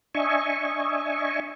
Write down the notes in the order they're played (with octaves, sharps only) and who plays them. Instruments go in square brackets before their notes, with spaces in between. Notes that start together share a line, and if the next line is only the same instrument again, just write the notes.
[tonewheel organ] D4 D#5 E5 G#5 C#6